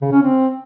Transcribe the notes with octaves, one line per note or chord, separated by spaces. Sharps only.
C#3
C#4
C4